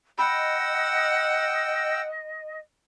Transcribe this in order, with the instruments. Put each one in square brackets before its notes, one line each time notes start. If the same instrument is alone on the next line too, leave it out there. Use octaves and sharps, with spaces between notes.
[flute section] D#5 [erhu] F#5 [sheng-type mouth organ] G5 E6 [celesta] B5